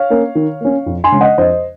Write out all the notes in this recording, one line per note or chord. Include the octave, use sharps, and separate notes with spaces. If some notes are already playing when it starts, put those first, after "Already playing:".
Already playing: C#5 F5
A#3 C#4
D#3
A#3 C#4
F2
G#5 C6
C#3 G#3 C#4
D#5 F#5
F2 C5 D#5